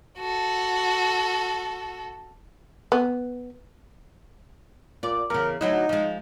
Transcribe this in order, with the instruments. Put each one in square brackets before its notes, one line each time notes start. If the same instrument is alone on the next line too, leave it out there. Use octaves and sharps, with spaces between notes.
[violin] F#4 A4
[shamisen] B3
[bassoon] A#2 [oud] D5
[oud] E2 C#3 [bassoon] A#4
[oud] D2 F#3 E4 [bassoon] D#4
[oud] F3 G#3